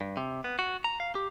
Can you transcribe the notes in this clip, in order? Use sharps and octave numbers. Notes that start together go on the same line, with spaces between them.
G2
C3
B3
F#4
A#5
F5
G4